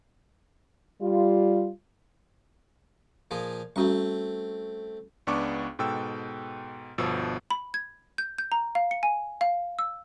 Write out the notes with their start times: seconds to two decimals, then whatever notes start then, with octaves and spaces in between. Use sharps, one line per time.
1.01 G3 F4
3.31 A#2 F3 G#4
3.76 G3 A3 C4 C#4 F#4 C#6
5.27 C#2 B3 D4 C#6 D6
5.79 G#2 B2 A4 G5 E6
6.98 G1 B2 F3 E6
7.51 B5
7.74 G#6
8.18 G6
8.38 G6
8.52 A#5
8.75 F5
8.91 C#7
9.03 G#5
9.41 F5
9.79 E6